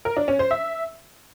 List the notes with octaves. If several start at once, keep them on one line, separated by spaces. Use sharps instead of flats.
A#4
D4
C#4
C5
E5